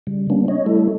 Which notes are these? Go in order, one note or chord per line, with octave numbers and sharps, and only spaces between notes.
C#3 G3
G3 A#3 B3 C#4 D4
C#5 D#5
G3 A3 E4 A4